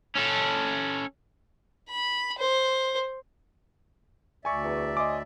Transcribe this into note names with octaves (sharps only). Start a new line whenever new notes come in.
C#4 A4
B5
C5
D2 D5 E5 G#5 C#6
E2
C#5 D#5 G#5 C6 D6